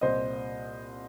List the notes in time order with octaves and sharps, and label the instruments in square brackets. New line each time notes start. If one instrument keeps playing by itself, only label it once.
[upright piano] C2 A#2 C5 D#5